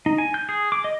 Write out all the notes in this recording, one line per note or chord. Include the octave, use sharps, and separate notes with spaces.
D#4
G#5
G6
G#4
D6
D#5